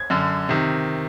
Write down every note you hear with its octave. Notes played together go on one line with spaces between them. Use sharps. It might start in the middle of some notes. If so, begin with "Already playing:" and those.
Already playing: G#6
F#2 D3
C3 D#3